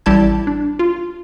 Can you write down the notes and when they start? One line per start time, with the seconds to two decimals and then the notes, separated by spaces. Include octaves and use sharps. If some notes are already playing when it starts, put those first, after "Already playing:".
0.06 A1 G3 E4 A5 G#6
0.47 D4
0.79 F4